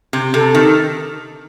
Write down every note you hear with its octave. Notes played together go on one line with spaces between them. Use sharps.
C3
C3 A4
G4
D#3